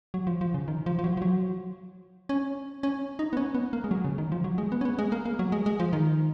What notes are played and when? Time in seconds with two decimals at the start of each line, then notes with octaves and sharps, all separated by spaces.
0.14 F#3
0.27 F3
0.41 F3
0.54 C#3
0.68 D#3
0.86 F3
0.99 F3
1.04 F#3
1.17 F3
1.22 F#3
2.29 C#4
2.83 C#4
3.19 D#4
3.33 B3
3.37 C#4
3.55 B3
3.73 A#3
3.84 G#3
3.91 F#3
4.05 C#3
4.18 D#3
4.32 F3
4.44 F#3
4.58 G#3
4.72 B3
4.81 C#4
4.85 B3
4.99 G#3
5.12 A#3
5.25 A#3
5.39 F#3
5.52 G#3
5.66 G#3
5.80 F3
5.93 D#3